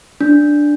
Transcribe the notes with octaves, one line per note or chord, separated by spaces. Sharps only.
D4